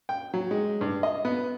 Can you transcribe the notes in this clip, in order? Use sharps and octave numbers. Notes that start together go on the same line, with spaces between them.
G5
F#3
G#3
G2
D#5
B3